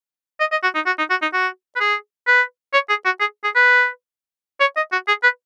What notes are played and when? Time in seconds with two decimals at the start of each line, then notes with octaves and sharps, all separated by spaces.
0.40 D#5
0.52 D#5
0.63 F#4
0.75 D#4
0.86 F#4
0.98 D#4
1.10 F#4
1.22 D#4
1.33 F#4
1.76 B4
1.80 G#4
2.27 B4
2.73 C#5
2.89 G#4
3.05 F#4
3.20 G#4
3.44 G#4
3.55 B4
4.60 C#5
4.76 D#5
4.92 F#4
5.08 G#4
5.23 B4